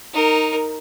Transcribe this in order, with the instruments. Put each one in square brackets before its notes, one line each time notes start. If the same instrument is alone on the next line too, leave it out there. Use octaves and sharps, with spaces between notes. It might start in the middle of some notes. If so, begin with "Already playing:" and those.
[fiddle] D#4 A#4